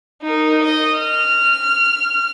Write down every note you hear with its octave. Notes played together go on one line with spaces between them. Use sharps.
D#4 A#4
D#5
F6